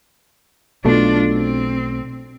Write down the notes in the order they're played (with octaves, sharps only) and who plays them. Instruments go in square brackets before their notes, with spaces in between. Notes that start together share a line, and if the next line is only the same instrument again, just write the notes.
[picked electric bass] B1 B2 A3 [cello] D4 F4
[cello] C4